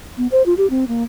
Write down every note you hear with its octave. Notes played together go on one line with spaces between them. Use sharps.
B3
C5
F4
G4
C4
A#3